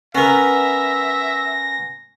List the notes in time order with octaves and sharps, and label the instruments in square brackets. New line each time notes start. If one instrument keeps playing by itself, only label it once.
[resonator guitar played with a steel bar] B3 [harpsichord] C#4 A#4 [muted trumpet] E5 [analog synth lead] A#6